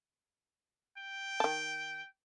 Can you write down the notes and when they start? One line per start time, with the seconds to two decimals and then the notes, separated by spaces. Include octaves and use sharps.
0.98 G5
1.40 D#3 A5